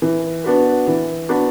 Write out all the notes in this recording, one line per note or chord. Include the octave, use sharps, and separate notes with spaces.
E3
B3 D4 F#4 B4
E3
B3 D4 F#4 B4